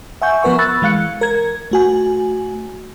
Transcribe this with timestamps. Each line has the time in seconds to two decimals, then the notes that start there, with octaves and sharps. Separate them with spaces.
0.22 E5 F#5 G#5 C#6 G6
0.43 F3 B3 A#4 B4 F#5 C#6
0.58 B5 C#6 E6 F#6 A6
0.82 E3 G#3 F5 F#6 C#7
1.21 A#4 G#6
1.71 A3 F#4 G#5